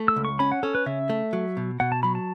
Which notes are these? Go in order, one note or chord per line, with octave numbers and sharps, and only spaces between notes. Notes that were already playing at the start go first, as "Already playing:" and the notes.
Already playing: A3
E6
C#2
C#6
C#4 B5
F#5
C#4 A4
B4
C#3 E5
A3
F#3
B2
B2 F#5
A5
F#3 B5
A5